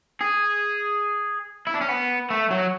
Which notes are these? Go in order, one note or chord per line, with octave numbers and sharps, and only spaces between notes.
G#4
E4
D4
C#4
B3
A3
F#3